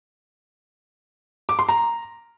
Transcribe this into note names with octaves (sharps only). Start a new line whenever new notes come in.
D6
C6
A#5